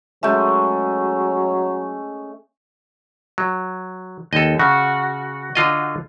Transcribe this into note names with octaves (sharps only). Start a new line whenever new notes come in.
F#3 G#3 A3 C#4 E5 G6
F#3
D#2 A4 D#5
C#3 F#4
D3 F4 D#5